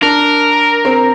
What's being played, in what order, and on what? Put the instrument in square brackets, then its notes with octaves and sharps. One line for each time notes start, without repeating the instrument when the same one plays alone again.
[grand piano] D4 [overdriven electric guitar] A#4
[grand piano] C4